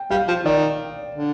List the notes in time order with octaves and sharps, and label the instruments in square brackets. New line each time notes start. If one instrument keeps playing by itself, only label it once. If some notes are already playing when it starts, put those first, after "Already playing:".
Already playing: [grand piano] G5
[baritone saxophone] G3 [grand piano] F5
[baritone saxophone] F3
[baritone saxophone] D#3 [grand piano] D5
[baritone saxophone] D3